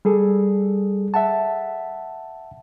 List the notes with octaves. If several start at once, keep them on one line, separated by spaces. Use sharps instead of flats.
G3 G#4 A4
E5 F#5 A5